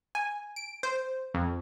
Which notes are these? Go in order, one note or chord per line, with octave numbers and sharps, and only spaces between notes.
G#5
D7
C5
F2